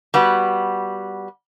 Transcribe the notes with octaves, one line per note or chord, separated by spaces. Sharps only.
G3 B3 F#4